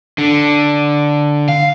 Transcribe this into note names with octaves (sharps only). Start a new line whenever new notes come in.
D3
F5